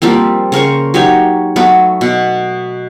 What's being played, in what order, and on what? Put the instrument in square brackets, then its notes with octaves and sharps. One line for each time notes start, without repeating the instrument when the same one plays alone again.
[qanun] F3 G3 A#3 C4
C#3 A#4 C5 C#6
F#3 D#4 G4 C#5
F#3 A3 B3
B2